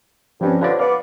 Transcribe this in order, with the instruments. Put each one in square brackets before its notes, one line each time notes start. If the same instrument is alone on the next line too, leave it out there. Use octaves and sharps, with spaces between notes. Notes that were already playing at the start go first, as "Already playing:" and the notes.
[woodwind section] G2 [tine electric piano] F3 C4 C#4
[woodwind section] D3 F3 [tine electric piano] B4 C#5 D5
[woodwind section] B3 D5 [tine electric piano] F5